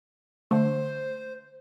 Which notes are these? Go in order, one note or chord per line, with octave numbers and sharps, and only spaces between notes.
D3 A3 C5